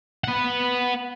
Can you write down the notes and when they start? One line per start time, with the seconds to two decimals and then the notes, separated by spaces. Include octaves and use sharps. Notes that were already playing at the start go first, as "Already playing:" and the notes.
0.24 B4 F#5